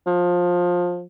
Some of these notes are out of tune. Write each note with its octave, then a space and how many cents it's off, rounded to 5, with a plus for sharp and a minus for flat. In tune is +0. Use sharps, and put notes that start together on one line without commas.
F3 +20